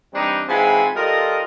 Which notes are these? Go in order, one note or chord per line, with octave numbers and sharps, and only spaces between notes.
E3 G3 C4 D4 D#4
G#2 E3 C4 F4 G#5 B5
G3 F4 A4 A#4 D#5